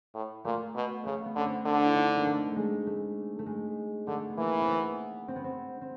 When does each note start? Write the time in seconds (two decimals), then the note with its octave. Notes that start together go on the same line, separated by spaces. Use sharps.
0.15 A2
0.44 A#2 A3
0.75 B2
1.05 C#3 A3
1.25 B3
1.35 D3 C#4
1.46 C4
1.66 D3 D4
1.86 E4
1.95 D#4
2.17 A#3
2.26 A3
2.51 G#3 A3
2.87 A3
3.39 A3
3.46 G#3
4.07 D3 A3
4.29 B3
4.37 E3 A#3
4.61 C4
4.68 B3
5.28 C4
5.36 B3
5.44 C4
5.81 C4